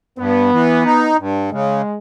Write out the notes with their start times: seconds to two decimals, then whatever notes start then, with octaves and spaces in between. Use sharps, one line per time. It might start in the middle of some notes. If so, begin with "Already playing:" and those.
0.19 G2 B3
0.52 E3
0.85 D#4
1.18 G2
1.51 C#3 G#3